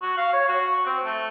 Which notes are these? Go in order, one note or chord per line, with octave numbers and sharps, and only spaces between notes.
F#4
F5
C#5
F#4
C4
A3